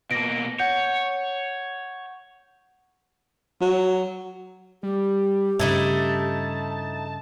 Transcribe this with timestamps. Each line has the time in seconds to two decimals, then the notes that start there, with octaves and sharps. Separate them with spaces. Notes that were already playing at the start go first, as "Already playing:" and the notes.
0.11 B2 A#3 A#6 D7
0.59 C#5 F#5 G6
3.61 F#3
4.83 G3 G4
5.59 G2 C#3 A3 D#4 E4 A5